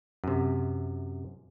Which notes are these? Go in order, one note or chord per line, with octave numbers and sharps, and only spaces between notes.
F#2 C3